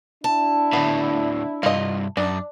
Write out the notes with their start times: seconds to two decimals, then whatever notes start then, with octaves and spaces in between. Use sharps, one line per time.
0.24 D4 E4 A5
0.73 D2 A2 B3
1.63 C2 G2 F4 D#5
2.17 F#2 D4